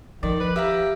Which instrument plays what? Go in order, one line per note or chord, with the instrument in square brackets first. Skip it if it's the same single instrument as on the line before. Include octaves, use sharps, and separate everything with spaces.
[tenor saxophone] D#3 [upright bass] F3 [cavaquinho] D5
[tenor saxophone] B4
[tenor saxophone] G4 [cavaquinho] E5 F5 A#5